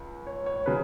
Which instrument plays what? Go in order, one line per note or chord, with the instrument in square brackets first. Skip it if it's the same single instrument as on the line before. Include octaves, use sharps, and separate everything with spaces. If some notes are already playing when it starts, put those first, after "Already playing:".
Already playing: [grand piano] C#2
C#5
C#5
C#3 F#3 B4